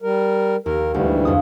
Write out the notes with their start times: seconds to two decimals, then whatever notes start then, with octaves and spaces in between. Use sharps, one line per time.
0.02 G3 A#4
0.66 D#2 A#4
0.94 D2 G#2 E3 G3
1.25 F2 D#6